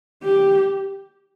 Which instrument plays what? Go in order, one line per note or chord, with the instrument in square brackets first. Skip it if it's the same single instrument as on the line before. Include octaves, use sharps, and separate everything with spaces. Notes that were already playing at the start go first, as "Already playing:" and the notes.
[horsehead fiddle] G4